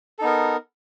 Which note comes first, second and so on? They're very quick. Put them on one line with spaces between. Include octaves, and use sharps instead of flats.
A4 D#4 B3 A#4